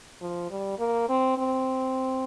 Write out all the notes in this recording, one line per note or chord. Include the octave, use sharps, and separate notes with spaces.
F3
G3
A#3
C4
C4